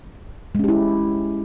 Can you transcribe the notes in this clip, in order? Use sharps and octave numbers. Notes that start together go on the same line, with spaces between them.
G#3 C#4 E4 G4